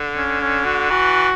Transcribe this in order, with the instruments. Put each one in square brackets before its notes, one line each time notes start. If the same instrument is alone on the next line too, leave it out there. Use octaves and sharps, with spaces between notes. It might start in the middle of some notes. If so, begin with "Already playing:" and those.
Already playing: [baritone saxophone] D3
[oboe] C#4
C#4
F#4
[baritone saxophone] E3 [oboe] F#4